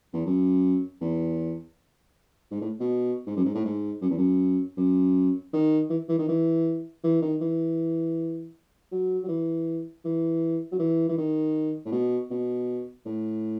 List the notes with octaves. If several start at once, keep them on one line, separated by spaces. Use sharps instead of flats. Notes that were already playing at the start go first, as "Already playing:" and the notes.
E2
F#2
E2
G#2
A2
B2
G#2
F#2
G#2
A2
G#2
F#2
E2
F#2
F#2
D#3
E3
E3
D#3
E3
E3
D#3
E3
F#3
F#3
E3
E3
F#3
E3
E3
D#3
A2
B2
B2
A2